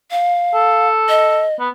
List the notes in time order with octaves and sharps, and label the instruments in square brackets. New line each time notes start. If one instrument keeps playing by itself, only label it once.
[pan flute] F5
[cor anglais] A4
[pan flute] D#5
[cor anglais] B3